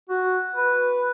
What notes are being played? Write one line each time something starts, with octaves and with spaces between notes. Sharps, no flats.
F#4
B4